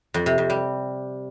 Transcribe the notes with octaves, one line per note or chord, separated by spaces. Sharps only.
F2
C3
F2
G3